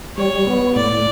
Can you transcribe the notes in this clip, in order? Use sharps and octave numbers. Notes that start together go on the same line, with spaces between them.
G3 C#5
B3
A2 D5